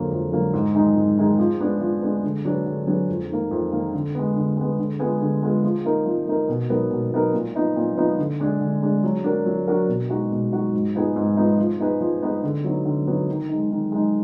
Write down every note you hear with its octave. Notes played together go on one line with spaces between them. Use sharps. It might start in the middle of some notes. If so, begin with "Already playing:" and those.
Already playing: F2 D3 F#3 A#3
F2
D3 F#3 A#3
G#2
D#3 G#3 D#4 G#4
G#2
D#3 G#3 D#4 G#4
F3
G#3 B3 D4 G#4
F3
G#3 B3 D4 G#4
D3
F#3 D4 G#4 B4
D3
F#3 D4 G#4 B4
F2
D#3 A#3
F2
D#3 A#3
D3
G#3 B3
D3
G#3 B3
D3
G#3 B3 F4 G#4
D3
G#3 B3 F4 G#4
F3
A#3 D#4 A#4
F3
A#3 D#4 A#4
B2
F#3 B3 D#4 A#4
B2
F#3 B3 D#4 A#4
A#2
F3 B3 D#4
A#2
F3 B3 D#4
D3
G#3 D4 G#4
D3
G#3 D4 G#4
F#3
D4 F#4 A#4
F#3
D4 F#4 A#4
B2
G#3 D#4 F#4
B2
G#3 D#4 F#4
G#2
F3 B3 D#4 G#4
G#2
F3 B3 D#4 G#4
F3
B3 D#4 G#4 B4
F3
B3 D#4 G#4 B4
D3
F#3 B3 D#4
D3
F#3 B3 D#4
D#3
G#3 D#4
D#3
G#3 D#4